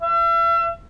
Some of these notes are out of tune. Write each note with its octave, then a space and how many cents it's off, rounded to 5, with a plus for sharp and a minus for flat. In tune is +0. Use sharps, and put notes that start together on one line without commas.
E5 +40